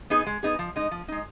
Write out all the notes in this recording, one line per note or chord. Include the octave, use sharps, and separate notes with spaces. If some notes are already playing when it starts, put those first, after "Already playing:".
B3 D#4 G#4
G#3
B3 D#4 G#4
F3
G#3 D#4
F3
G#3 D#4